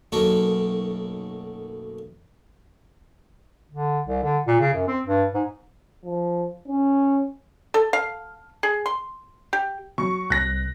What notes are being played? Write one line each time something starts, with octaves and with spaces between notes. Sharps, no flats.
B1 F#2 A3 A#3 D#4 C#6
D3
C2
D3
A#2
C#3
F#2
C4
G2
G#2
F3
C#4
A4
F5
G#4
C6
G4
F#3 C#6
C2 F#6 A#6